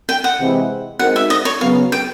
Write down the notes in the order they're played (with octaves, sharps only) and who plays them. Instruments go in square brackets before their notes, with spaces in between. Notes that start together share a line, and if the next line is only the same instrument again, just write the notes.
[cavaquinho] G5
F#5
[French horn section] C3 E3 G#3 C4 E4
[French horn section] G#3 C4 D#4 F#4 A#4 [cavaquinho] F#5
[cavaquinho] E5
D#5
C#5
[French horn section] C#3 F#3 B3 [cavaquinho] F5
[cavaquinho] G5